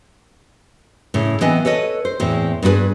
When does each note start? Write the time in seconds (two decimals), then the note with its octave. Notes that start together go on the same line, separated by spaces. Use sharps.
1.14 A2 C#3
1.41 E3 B3 C4 D#5 G#5
1.65 A4 B4 C#5 D#5
2.05 C5
2.20 E2 A2 C4
2.63 G2 B3 D#4 E4 G#4 B4